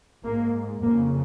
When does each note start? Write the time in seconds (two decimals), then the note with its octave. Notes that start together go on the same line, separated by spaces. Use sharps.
0.24 G#2 A#3
0.82 F2 C#3 A#3